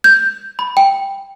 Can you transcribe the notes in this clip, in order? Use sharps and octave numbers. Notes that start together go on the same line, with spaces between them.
G6
B5
G5